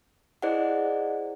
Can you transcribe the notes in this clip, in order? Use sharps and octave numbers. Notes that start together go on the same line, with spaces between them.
E4 G#4 C5 D5 D#5 F#5